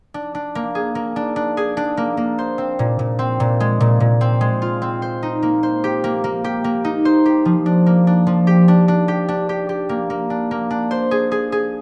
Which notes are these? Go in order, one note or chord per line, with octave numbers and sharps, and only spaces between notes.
D4
D4
A#3
G#4
A#3
D4
D4
G#4
D4
A#3
A#3
C5
C4
A#2
A#2
C4
A#2
G#3
A#2
A#2
C4
G#3
F4
C4
C5
D#4
A#3
C5
G4
A#3
A#3
G4
A#3
D#4
C5
G4
F3
D4
A#3
D4
F3
G4
D4
D4
G4
D4
G4
G4
A#3
A#3
D4
A#3
D4
C5
G#4
G#4
G#4